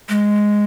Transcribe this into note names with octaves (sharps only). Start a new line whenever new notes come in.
G#3